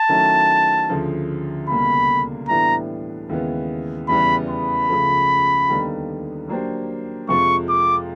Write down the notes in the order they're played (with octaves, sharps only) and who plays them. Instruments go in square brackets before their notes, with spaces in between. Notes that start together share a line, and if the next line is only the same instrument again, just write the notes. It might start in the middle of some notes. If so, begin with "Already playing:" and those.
Already playing: [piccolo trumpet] A5
[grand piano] D#3 F#3 A3 C#4 E4
D2 C#3 F3
[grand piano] C#2 B2 G3 A#3 [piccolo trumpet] B5
[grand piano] A2 E3 G3 B3 D4 [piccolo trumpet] A#5
[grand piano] D#2 C#3 E3 G#3 B3
[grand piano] E2 C#3 E3 G3 B3 [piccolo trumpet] B5
[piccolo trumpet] B5
[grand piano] C#2 C#3 F3 A3
D#2 D3 G3 B3 D#4
F#3 A#3 D4 G4 C5
[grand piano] F2 C3 F3 G#3 [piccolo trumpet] C#6
[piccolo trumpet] D6